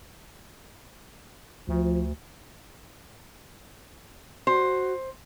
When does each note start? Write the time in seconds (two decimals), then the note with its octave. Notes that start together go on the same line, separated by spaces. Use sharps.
1.68 D2 F3
4.47 F#4 C5